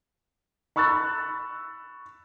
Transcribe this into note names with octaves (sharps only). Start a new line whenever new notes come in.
B5 C#6 E6 F#6 A6